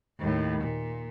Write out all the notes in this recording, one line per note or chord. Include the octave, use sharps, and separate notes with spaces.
D#2 A2
A#2